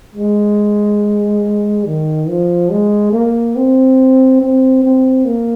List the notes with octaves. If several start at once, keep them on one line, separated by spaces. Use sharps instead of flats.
G#3
D#3
F3
G#3
A#3
C4
C4
C4
A#3